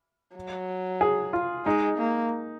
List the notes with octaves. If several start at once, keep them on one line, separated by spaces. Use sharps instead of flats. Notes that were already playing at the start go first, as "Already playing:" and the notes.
F#3
G#4
F4
G#3 D#4
A#3